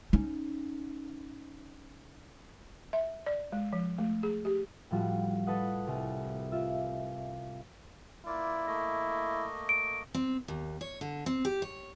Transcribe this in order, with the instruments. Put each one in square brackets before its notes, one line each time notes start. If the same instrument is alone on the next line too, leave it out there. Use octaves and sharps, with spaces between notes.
[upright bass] C#4 D#4
[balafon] E5
D5
G#3
F3
A3
G#4
G4
[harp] A2 F3 G3 F#4
A4 B4 D#5 F#5
C2
F4 E5
[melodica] A#3 F4 D5 [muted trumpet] E4
[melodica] A3 A#3 D#5
[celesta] D7
[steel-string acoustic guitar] C4
D#2
C#5
D3
C4
G4
C#5